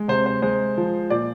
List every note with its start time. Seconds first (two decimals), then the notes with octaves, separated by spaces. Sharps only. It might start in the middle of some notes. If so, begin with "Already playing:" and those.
Already playing: G#3
0.08 C3 C5
0.26 C5
0.42 G#3 C5
0.77 F3
1.10 A#2 D5